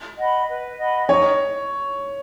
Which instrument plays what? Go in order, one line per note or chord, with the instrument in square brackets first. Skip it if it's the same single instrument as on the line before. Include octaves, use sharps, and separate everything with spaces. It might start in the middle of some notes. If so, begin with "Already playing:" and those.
[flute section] D#5 F#5 B5
B4
D#5 F#5 B5
[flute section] D#4 [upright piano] C#5